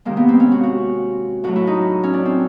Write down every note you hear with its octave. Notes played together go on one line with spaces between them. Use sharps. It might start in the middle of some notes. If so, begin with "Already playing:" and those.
C3 D#3 G#3 A#3
B3
C4
C#4
F#4
F#4
A2 F#3 A3 F#4
E4
D#4
C#4
D4
C4